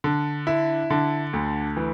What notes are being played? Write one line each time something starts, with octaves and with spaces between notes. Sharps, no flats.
D3
E4
D3
D2
E3